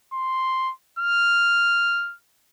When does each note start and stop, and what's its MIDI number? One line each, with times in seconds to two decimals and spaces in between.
0.13 0.72 84
0.99 2.15 89